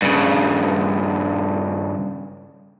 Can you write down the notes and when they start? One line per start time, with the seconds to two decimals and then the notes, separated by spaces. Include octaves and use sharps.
0.02 G2 C#3